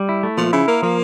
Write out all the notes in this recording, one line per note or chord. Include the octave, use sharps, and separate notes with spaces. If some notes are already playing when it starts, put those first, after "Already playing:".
Already playing: G3
E4
A3
A#2 F3
C#3 E4
A#3 A#4
F3 A#3